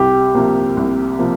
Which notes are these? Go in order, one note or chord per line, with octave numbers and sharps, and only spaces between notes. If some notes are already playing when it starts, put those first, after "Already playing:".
Already playing: C2 G4
C3 F3 A#3
C2
C3 F3 A#3